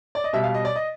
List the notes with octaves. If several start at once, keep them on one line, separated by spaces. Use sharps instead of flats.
D5
D#5
B2 G3 E5
F5
D#5
D5
D#5